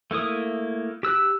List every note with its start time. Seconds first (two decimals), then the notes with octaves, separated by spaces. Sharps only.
0.11 A3 A#3 E4 D#6
1.03 G4 E6 F#6